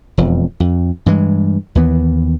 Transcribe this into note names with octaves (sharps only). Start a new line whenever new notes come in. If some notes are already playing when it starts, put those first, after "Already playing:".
E1 F2
F2
G2 E3 G#3
D#2 E3 B3